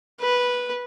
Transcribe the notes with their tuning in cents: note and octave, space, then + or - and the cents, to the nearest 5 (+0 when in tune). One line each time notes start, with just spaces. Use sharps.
B4 -10